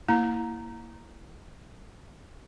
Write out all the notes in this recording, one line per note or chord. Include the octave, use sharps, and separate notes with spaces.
A#3 E4 A#5